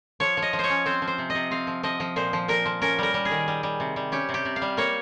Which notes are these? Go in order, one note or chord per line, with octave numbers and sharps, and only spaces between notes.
F3 C#5
F3
D#5
F3
C5 C#5
C#4
C4 C5
F3
C5
C3
C3 D#5
C4 F5
F3
F3 D#5
F3
A#2 C5
F3
A#2 A#4
F3
C#4 A#4
G3 A#4
G3
G#4
D#3
G3
G3
C3
G3
C#4 G4
C3
G4
C3
F5
G3
A#3 C#5